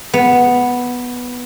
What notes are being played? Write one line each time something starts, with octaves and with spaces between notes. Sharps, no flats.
B3